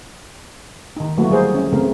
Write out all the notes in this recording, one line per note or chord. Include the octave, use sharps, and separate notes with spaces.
D#3 D#4
D3 F#3 A3 A#3 E4 F#4
F#3 G3 G#4 A#4 C5
C#4
C#3 E3 A3 C4 A#4